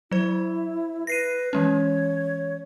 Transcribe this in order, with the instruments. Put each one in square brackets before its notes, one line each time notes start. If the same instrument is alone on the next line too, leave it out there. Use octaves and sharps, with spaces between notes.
[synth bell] F#3 C5 [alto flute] E4
[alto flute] B4 [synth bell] A#6 C7 D#7
[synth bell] E3 G#3 C#4 [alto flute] C#5